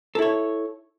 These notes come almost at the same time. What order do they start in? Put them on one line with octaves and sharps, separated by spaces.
A4 E4 C#5